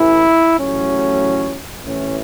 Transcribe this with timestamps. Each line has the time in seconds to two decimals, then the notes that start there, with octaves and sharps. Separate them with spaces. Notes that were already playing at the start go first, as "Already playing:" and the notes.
Already playing: A1 A2 E3 E4
0.57 A1 A2 F#3 C#4
1.84 A1 A2 E3 C#4